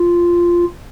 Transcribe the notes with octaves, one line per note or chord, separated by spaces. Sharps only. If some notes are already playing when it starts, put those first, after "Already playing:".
Already playing: F4